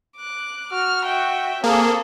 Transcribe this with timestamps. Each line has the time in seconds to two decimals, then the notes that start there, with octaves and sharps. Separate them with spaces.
0.17 D6 F#6
0.73 F#4 F6
1.05 E5 G5
1.64 A#3 C4 G#4 A4